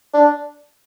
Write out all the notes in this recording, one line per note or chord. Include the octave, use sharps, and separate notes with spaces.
D4